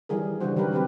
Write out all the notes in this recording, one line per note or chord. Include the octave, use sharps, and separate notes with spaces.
D#3 E3 G3 G#4 A#4
C#3 E3 G3 D4 F#4 C5
D#3 F#3 G4 A#4 B4
G#3 B3 C4 G4 B4